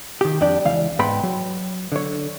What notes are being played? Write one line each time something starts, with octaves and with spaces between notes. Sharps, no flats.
D#3 G4
F2 G3 D4 D5 G5
C#2 E3 F5
G#2 B3 G5 B5 C6
F#3
D3 C#5